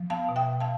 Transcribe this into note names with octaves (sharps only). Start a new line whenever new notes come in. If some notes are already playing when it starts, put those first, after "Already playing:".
Already playing: F3
B3 F5 A5
B2
E5 G5
B2
F5 A5